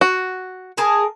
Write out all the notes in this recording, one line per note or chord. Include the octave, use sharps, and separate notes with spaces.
F#4
G#4 A#4 A5